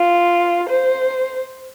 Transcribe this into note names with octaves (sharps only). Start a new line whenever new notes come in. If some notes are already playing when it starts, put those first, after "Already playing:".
Already playing: F4
C5